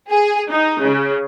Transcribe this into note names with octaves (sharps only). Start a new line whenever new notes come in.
G#4
D#4
C#3